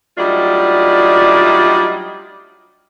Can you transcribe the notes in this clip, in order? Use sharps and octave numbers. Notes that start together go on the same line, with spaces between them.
F#3 G3 A3 D4 D#4 F4